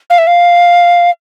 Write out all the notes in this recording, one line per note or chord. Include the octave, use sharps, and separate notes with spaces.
F5
E5
F5